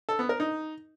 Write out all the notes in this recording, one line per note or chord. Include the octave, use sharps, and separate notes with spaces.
A4
B3
A#4
D#4